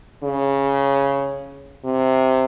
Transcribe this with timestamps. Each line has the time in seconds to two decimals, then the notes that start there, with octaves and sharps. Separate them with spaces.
0.23 C#3
1.85 C3